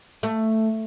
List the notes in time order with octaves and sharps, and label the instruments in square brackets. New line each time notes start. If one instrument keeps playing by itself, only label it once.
[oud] A3